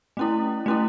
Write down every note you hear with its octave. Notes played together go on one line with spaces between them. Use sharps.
A3 C#4 E4
A3 C#4 E4